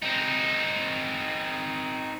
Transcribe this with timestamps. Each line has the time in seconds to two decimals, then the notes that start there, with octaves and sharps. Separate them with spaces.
0.02 C4 D#4